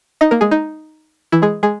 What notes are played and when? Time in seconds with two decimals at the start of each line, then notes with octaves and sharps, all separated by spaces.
0.21 D#4 D#5
0.31 A#3 A#4
0.41 G#3 G#4
0.51 D#4
1.32 E3 E4
1.42 G#3 G#4
1.63 G#3 G#4